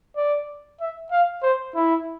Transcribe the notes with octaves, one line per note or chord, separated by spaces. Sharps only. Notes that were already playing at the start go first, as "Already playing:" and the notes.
D5
E5
F5
C5
E4